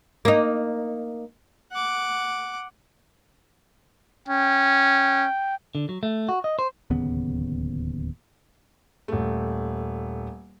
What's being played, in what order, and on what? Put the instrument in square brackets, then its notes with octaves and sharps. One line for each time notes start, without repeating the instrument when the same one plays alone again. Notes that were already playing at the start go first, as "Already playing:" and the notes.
[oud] A#3 D#4
[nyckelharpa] F#5 D6
[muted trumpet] C#4 [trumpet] G5
[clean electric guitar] D3
F#3
A3
F#4
D#5
C5
[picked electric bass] D1 D#2 C#3 B3
[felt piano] D#1 A3